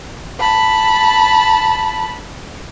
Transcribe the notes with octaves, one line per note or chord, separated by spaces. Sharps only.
A5 B5